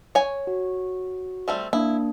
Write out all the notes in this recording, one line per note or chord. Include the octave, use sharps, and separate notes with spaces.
C#5 G#5
F#4
G3 A3 C4
A#3 D4 E4